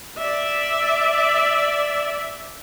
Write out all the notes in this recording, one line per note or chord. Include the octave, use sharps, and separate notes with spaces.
D5 E5